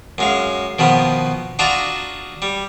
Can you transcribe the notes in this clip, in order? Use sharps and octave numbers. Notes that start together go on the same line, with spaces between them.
F#2 G#3 F5
B2 D#3 F3 B3
D4 F4 F#4 D#5 A5 A#5
G3